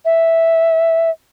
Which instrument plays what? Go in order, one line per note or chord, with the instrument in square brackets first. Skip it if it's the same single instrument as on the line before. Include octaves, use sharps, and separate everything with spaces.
[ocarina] E5